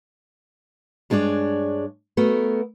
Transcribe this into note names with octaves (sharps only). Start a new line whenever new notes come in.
G2 G#3 D4 C#5 D5
A3 B3 F#4 A#4